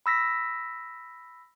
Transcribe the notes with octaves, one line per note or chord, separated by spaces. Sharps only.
B5 E6 A#6 B6